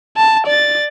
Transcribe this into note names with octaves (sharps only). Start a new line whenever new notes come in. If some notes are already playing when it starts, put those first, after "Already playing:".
A5
D5 A6